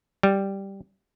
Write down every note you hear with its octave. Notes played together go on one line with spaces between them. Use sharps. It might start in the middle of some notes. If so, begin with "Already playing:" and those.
G3